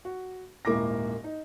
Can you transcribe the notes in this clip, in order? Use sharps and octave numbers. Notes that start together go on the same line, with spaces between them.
F#4
D#1 G#2 A#3 E4 D6 A#6
D#4